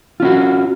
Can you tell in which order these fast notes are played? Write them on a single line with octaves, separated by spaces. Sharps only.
F4 C#4 F#4